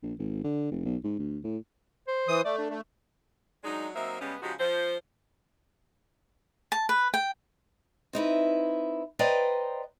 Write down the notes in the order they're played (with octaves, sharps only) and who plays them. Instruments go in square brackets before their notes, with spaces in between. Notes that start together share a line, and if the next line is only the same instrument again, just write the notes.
[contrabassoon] A#1
G#1
D3
F1
B1
G#2
D2
A2
[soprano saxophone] C5
[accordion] E3 D#6
[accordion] A3 [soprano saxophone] D5
[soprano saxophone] D4
[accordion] A3
[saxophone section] F#3 G#3 D4 D#4
F#3 A#3 C4 D#4 E5
C#3 G3 G#3 B3 C#4
C#3 F3 G#3 D#4 F#4 G4
F3 C5
[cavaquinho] A5
B4
G5
[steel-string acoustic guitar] C4 D#4 E4 B4
B4 C5 D5 D#5 G5 A#5